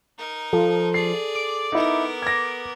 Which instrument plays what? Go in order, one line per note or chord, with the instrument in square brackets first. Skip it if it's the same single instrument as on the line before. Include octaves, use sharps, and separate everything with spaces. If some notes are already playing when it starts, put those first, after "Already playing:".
[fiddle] D#4 A#4
[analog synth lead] F3 [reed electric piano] A4
[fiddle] G#4 D5 [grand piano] C7
[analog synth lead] D6
[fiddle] B3 A#4 [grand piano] D#4 E4
[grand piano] G#6 A#6